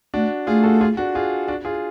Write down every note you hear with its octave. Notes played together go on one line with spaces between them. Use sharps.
A3 D4 F#4
A3 F4 G#4
F#4 A4
F4 G#4
D4 F#4
F4 G#4
D4 F#4
F4 G#4